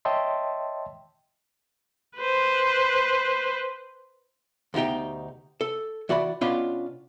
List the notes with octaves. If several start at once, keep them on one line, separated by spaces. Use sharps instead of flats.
C#5 D#5 E5 G5 A5 C6
B4 C5
D2 B2 D#4 G4 G5
A4
E3 F#4 D5 B5
B2 C#4 D4 F4 F5 B5